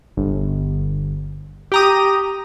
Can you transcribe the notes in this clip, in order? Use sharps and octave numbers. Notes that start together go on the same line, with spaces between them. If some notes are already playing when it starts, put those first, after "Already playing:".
G1
G4 A#5 D#6